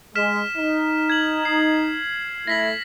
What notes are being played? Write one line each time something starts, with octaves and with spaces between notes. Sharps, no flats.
G#3 F6 B6 E7
D#4
G#6 F#7
C7
A3 E4 A#6 B6 F#7